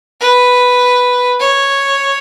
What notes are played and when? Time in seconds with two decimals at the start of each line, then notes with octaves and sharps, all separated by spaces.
0.21 B4
1.40 C#5